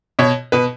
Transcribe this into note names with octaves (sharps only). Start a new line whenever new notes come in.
B2 C#5
B2 B4